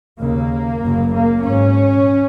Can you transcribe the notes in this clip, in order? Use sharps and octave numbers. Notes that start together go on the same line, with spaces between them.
D#2 C#3 A#3
F#1 F#2 C#3
A#3
G#1 G#2 C#4